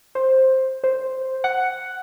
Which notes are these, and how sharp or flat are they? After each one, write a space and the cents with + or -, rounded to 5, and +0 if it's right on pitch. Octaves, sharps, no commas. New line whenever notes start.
C5 +10
C5 +0
F#5 +5